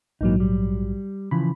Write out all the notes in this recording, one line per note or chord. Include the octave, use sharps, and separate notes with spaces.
A#1 G#2 E3 F#3 A#3 D#4
G3
C#3 E3 F3 B5